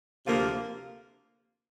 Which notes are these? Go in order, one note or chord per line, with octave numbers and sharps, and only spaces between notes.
D2 C3 F3 A#3